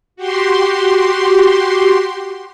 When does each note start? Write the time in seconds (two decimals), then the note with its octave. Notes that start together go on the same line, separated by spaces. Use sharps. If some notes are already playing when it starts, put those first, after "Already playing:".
0.16 F#4 G4 C6